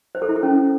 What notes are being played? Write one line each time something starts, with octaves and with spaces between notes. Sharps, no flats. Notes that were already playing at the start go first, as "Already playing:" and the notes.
C5
A4
E4
A4
C#4